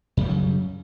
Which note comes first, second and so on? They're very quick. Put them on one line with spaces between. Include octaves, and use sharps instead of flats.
F#2 G3 F#3 C#3